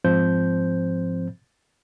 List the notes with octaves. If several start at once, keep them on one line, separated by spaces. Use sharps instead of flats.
G#2 F3 C4 C5 G6